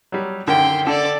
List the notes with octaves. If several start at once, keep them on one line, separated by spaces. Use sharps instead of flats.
F#3 G3
F#2 D3 D#3 G5 C6
D3 A4 D5